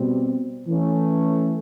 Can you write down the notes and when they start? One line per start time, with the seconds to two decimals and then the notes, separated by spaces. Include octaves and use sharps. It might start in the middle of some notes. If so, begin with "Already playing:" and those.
Already playing: B2 G3 C4
0.67 E3 A3 C#4